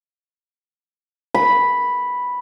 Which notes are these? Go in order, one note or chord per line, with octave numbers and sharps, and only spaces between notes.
B5